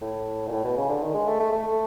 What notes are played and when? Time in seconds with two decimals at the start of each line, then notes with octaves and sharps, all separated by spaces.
0.02 A2
0.48 A#2
0.52 A2
0.64 B2
0.77 C#3
0.89 D3
1.03 D#3
1.14 G#3
1.28 A3
1.40 A3
1.52 A3